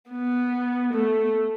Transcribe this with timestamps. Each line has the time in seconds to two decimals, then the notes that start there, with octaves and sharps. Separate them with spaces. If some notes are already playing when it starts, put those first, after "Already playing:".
0.11 B3
0.93 A3